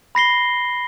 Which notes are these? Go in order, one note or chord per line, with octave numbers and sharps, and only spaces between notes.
B5 A#6 C7 G7